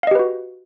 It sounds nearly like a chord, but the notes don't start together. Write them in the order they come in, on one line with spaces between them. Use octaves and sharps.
F5 D#5 G4 B4 F#4